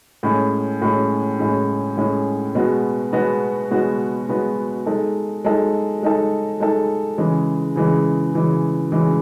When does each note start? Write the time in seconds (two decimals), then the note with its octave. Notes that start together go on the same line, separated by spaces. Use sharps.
0.23 A2 G#3 C#4
0.82 A2 G#3 C#4
1.39 A2 G#3 C#4
1.97 A2 G#3 C#4
2.55 B2 G#3 B3 F#4
3.13 B2 G#3 B3 F#4
3.71 B2 G#3 B3 F#4
4.29 B2 G#3 B3 F#4
4.86 G#3 D#4 A4
5.45 G#3 D#4 A4
6.03 G#3 D#4 A4
6.60 G#3 D#4 A4
7.18 C#3 E3 G#3
7.76 C#3 E3 G#3
8.34 C#3 E3 G#3
8.92 C#3 E3 G#3